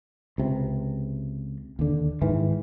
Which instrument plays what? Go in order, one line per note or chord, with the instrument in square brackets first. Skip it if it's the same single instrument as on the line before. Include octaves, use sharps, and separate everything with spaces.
[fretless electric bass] C#2 C3
D#2 D3
G#2 D#3 E3